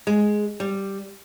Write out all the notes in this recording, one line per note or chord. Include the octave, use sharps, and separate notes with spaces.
G#3
G3